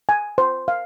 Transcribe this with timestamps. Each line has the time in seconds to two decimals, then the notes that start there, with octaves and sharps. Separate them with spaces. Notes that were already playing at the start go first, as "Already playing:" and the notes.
0.09 G#5
0.38 C5
0.68 F5